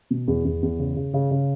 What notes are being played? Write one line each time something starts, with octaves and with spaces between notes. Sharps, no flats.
B2
E2
E2
E2
C#3
C#3
C#3
C#3